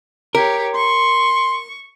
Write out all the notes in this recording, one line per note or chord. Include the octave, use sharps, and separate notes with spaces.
G4 A#4 C#5
C6 C#6